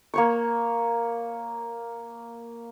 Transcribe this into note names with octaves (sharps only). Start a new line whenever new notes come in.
A#3 C#5 C#6